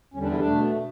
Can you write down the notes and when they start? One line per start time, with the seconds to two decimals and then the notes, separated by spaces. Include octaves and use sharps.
0.14 E2 D3 G3 C#4
0.23 D4
0.31 E4
0.38 D4
0.46 B2 A3